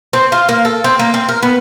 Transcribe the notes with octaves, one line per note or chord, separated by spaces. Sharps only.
C4
F4
A#3
A4
C4
A#3
C4
A#4
B3